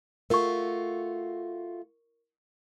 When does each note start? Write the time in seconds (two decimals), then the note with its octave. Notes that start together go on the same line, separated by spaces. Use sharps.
0.30 A3 F4 F#4 A#4 C#6